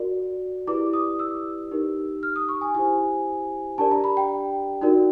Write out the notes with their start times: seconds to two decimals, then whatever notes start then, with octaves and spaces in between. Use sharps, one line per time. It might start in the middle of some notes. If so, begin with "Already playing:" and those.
Already playing: F#4 A#4 D5
0.67 E4 G4 B4 D5 D6
0.93 D#6
1.19 E6
1.71 D#4 G4 A#4
2.23 F6
2.36 D#6
2.49 C#6
2.61 G#5
2.75 E4 G4 C5 G#5
3.78 D4 G4 A#4 D5 A5
3.91 A#5
4.04 B5
4.17 G5
4.81 D#4 F#4 A#4 D5